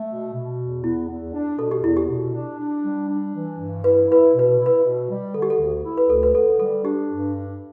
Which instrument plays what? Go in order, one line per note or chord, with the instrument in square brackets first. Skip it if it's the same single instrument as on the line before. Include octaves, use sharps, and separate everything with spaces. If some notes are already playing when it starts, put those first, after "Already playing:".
Already playing: [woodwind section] A3
B2
B2
E2
[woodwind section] B3 [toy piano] E4
[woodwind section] E2
D4
[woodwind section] B2 [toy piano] A4
[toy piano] G4
[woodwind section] E2 [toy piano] E4
[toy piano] G4
[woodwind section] B2
D4
D4
G3
D4
E3
G2
[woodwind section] E4 [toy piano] B4
[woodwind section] E4 [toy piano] B4
[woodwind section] B2 [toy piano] B4
[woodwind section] E4
[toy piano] B4
[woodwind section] B2
G3
[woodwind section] D3 [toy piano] A4
[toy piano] G4
A4
[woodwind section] D2
E4
[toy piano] B4
[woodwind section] D2 [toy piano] A4
[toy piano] B4
[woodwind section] D3 [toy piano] A4
[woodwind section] G3 [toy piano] A4
[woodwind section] D4 [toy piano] G4
[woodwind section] G2
D4